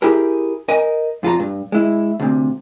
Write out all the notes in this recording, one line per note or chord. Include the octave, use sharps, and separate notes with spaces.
E4 G4 G#4 A#4
A#4 D#5 G#5
F2 F4 G#4 A#5
G2
G#3 E4
D2 C3